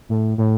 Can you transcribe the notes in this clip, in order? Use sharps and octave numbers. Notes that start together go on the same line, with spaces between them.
A2
A2